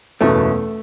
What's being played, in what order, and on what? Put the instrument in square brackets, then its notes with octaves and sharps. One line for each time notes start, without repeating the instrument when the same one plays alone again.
[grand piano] F#1 E2 B2 [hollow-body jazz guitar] A3